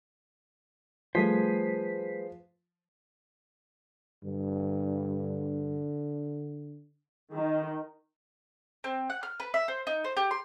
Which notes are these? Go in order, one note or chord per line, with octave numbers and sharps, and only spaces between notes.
F3 G3 A3 G#4 B4 C5 B6
G2 D3
D#3
C4
F#5
F6
B4
E5
C5
D#4
C5
G4
C6